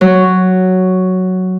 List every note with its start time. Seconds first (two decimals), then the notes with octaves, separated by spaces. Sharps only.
0.01 F#3